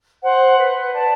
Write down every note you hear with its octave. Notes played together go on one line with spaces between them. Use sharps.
C5 F#5
B4
D5 A5